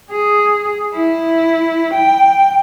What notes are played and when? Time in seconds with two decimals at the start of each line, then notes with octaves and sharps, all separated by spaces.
0.11 G#4
0.94 E4
1.94 G5